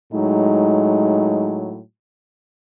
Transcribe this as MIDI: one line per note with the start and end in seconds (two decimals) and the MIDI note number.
0.13 1.81 45
0.13 1.81 54
0.13 1.81 56
0.13 1.81 63